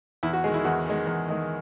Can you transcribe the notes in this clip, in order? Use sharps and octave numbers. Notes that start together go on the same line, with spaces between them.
E2 E4
F#4
D#3 G#3 G#4
E4
E2 F#4
D#3 G#3
E2
D#3 G#3